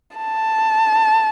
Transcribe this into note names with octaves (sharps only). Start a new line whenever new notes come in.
A5